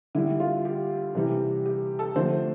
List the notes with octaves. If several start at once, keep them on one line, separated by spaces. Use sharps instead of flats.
D3 G3 E4
F4
G4
C3 E3 G3
G4
A4
D3 F3 A3 C5